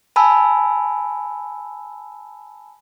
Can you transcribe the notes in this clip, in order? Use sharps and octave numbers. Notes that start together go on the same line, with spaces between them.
G#5 A5 B5 E6